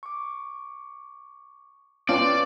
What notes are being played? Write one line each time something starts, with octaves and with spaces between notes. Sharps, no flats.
C#6 D6
C4 C#4 F4 B4 C#5 D5 A5